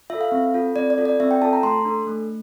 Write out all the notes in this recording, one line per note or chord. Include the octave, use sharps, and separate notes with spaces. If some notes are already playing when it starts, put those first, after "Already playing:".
F4 A4 E5
F5
C4
F4 A4
C4 D5
D5
F4 A4
D5
C4 E5
G5
F4 A4 A5
A#5
A3 C6
D4 A4
A3